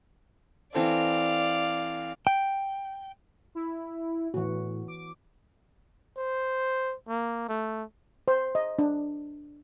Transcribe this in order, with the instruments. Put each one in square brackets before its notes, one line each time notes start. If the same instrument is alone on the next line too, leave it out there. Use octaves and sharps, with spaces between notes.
[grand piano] E3 C4 A4 [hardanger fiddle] D5 F5
[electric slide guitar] G5
[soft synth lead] E4
[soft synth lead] A2 [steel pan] E3 F#4
[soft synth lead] D6
[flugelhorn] C5
A#3
A3
[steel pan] C5
D#5
D4